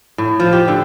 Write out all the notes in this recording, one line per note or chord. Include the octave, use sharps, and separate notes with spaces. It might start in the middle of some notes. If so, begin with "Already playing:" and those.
A2
F3
G4
D3